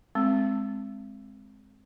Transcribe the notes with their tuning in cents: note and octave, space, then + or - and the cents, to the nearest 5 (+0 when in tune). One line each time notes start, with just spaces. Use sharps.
G#3 +0 C4 +0